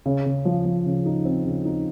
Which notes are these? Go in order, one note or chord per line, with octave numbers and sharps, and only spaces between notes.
C#3
C#3
F3
F3
C#3
D#4
C4
C#3
D#4